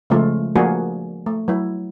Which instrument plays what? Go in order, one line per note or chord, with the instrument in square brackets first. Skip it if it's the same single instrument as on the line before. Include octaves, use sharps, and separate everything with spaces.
[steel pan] C#3 F3 G#3 A3 F4
F3 A3 A#3 D4 F#4 G#4
A3
F#3 E4